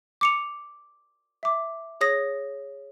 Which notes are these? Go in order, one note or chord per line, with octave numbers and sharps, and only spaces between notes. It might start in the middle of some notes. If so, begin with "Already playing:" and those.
D6 C#7 F7
E5 D6
G#4 C#5 D#6 A#6